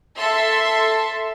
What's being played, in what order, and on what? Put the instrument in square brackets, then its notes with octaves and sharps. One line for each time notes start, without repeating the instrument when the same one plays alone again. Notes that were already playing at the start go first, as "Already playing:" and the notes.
[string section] A4 E5 C6